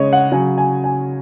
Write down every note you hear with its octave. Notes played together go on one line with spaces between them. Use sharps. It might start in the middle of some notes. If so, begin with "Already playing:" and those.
Already playing: C#3 G#3 C#5 D#5
F#5
C#3 F#3 G#5
G#5
G#5